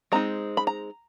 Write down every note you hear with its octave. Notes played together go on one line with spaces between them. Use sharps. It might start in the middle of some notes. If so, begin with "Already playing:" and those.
G#3 C4 D#4 A#5
B5
A#5